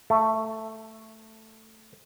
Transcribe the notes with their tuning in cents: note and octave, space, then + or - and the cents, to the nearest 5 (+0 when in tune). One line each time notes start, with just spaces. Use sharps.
A3 +10